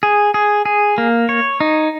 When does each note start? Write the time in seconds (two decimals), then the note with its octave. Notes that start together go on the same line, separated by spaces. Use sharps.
0.03 G#4
0.34 G#4
0.66 G#4
0.98 A#3
1.29 C#5
1.60 D#4